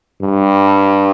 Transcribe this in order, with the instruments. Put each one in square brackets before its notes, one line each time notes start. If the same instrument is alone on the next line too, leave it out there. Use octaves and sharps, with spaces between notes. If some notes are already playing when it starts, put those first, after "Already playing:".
[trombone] G2